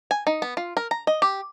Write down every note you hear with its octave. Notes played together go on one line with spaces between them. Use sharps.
G#5
D#4
B3
F4
A#4
A#5
D#5
G4